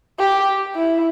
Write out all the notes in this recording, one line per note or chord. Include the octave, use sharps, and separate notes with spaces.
G4
E4